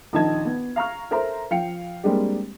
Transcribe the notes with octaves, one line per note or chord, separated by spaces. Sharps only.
A#1 D#3 D#4 A5 G#6
B3
F5 A#5 C#6 F6
A4 A#4 C5 E5 A#5
F3 F5 G5 C#7
G3 G#3 A#3 C4 D4 G4